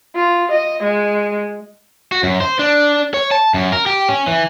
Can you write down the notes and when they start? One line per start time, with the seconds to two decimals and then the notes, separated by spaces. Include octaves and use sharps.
0.16 F4
0.51 D#5
0.83 G#3
2.12 F#4
2.23 F#2
2.40 C5
2.59 D4
3.14 C#5
3.31 A5
3.54 F#2
3.72 A#4
3.86 G4
4.09 C#4
4.27 E3